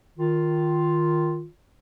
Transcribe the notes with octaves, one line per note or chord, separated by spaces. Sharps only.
D#3 F4